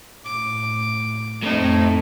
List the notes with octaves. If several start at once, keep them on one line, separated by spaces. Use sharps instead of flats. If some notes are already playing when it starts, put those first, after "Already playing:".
A2 D6
F2 A2 C4 D#4